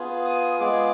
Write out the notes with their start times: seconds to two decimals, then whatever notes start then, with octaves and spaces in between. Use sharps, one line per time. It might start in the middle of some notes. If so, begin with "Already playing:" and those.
Already playing: B3 F4 G#4
0.25 D#6
0.60 G#3 B3 F4 G#4 D6